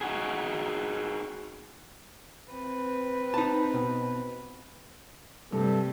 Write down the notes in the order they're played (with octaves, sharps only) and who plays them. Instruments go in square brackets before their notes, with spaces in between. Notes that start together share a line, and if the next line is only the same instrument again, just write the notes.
[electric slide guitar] D#4 F#4 G#4
[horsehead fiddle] C4 B4
[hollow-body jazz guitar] D#4 A5
B2
[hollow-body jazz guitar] G2 [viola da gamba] C3 G3 A3 [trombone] A4